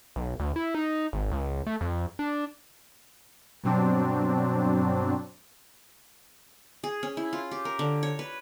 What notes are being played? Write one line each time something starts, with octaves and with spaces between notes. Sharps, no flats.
B1
D2
E4
D#4
G#1
C#2
A3
F2
D4
G2 B2 F#3 C4 D4
G#4
C#4
E4
F4
G4
A#4
D3
C#5
B4